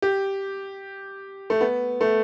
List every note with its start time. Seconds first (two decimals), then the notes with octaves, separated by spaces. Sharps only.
0.02 G4
1.50 A3
1.61 B3
2.01 A3